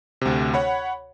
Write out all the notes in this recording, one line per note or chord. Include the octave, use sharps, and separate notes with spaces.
D2 C3
C#5 F#5 B5